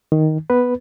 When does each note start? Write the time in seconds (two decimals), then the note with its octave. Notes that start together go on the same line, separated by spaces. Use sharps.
0.12 D#3
0.50 B3 B4